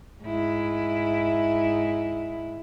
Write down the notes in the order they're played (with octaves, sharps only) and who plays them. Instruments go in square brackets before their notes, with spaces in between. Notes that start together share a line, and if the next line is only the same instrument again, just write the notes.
[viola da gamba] G#2 E4